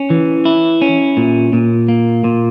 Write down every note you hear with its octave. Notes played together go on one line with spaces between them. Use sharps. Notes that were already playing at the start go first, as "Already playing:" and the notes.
Already playing: C#4
E3
E4
C#4
A#2
A#2
A#3
A#2